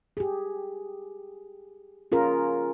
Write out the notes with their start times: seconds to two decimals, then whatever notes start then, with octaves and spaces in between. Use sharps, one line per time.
0.17 G4 G#4
2.12 C#4 F4 G#4 A#4